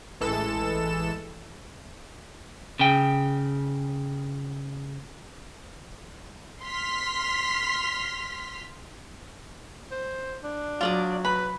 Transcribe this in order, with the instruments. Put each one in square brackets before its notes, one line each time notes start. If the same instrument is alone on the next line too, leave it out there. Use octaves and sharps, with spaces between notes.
[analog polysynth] A1 E3 G#3 A4 E7
[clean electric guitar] C#3 G5
[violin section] C6 F6 B6
[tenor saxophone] C5
D4
[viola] F#3 [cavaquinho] F4 D5 D#6
[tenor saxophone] B4 [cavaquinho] B5